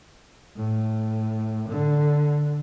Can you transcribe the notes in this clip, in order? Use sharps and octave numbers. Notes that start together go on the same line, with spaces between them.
A2
D3